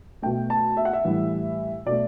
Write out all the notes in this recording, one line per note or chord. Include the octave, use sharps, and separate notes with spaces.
B2 A3 G5
A5
E5
F#5
E5
A2 E3 G3
B2 A3 D5